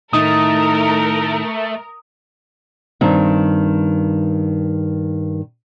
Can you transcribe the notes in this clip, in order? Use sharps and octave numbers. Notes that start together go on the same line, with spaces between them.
A2 D#3 A3 D#4 A#4 D#6
G2 D#3 C4